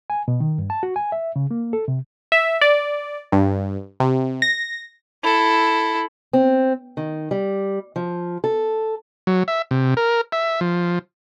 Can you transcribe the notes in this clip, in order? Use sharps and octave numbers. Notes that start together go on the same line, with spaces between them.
G#5
B2
D#3
G2
A5
F#4
G#5
E5
C#3
A#3
A4
C3
E5
D5
G2
C3
A#6
E4 A4
C4
D#3
G3
F3
A4
F#3
E5
C3
A#4
E5
F3